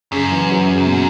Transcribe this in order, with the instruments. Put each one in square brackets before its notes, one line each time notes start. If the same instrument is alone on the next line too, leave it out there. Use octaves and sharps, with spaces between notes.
[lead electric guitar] F#2 [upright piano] C#3
[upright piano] C#3
E3
F#3
C#3
B2